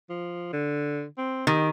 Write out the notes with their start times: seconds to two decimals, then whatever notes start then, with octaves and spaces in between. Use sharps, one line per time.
0.10 F3
0.53 D3
1.17 C4
1.47 D#3 G4